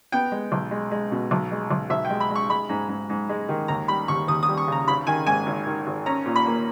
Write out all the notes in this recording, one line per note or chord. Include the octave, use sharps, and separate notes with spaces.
B3 G5
G#3
B1
G#3
G#3
B2
B1
G#3
B1
B1 E5
G5
G#3
B5
G#3
C#6
G#3 B5
G#2
G#2
G#2
G#3
D#3
D#2 A#5
G3 B5
D#2 C#6
D#2 D#6
D#6
G3
C#6
C#3 A#5
G#1 B5
D#3 G#5
G#2 G#5
G#1
D#3
G#1
C#4 A#5
A#2
B5
A#3